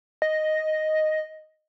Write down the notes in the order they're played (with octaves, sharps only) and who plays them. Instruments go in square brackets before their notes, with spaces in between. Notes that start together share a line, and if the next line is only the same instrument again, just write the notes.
[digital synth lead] D#5